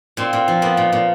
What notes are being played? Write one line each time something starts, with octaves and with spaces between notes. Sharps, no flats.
A#2 C4
A#2
F3
A#3 B3
A#2
A#2